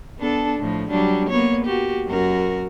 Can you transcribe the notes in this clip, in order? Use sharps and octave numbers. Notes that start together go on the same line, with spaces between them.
B3 D4 A4
A2 F3
F#3 G3 D4
A#3 B3 C#5
A#3 F#4 G4
F#2 F#4 A#4